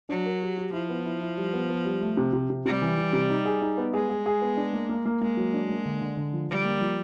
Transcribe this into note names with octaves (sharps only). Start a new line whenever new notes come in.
F#3 D4
A#4
G4
G4
F3 E4
B3
E4
E4
G3
B3
B3
G3
A3
C3
C3
C3
C3 G3
E3
E3
C3
D#4
G#4
D#4
B3
G#3 G#4
G#4
G#4
B3
D4
A#3
A#3
A#3
G#3 A#3
F#3
D4
A#3
D3
D3
D3
F3
D3 G3
A#3
F3